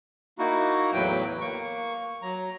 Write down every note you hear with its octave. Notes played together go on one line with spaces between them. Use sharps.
A#3 D#4 E4 F#4
E2 A2 F#3 B4 G5
A#3 C#6
F#3 A#5